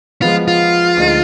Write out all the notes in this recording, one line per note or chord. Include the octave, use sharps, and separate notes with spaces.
F3 G#3 B3 F4
F4
D2 D3 G#3 D#4